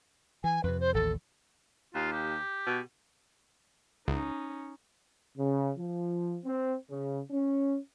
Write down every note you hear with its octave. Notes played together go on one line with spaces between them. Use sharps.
E3 G#5
F2 C3 B4
C5
A1 D#2 A4
D#2 F4
G4
B2
C#2 C#4 D#4
C#3
F3
C4
C#3
C#4